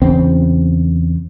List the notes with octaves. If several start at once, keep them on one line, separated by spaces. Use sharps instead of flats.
E2 C#3 C4